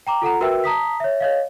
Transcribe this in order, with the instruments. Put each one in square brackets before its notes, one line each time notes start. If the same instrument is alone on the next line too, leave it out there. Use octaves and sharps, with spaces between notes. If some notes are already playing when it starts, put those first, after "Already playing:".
[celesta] G5 A#5 D6
F4 A4 F#5 A#5
F#4 A#4 B4 E5 G5 E6
A5 A#5 D#6 B6
C#5 E5
C#5 D#5 F5